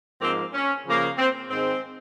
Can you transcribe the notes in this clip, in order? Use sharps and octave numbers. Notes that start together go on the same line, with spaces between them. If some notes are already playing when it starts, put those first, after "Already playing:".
G#2 F3 A#3 C4
C#4
C#3 F3 A#3
C4
G#2 D#3 G#3 C4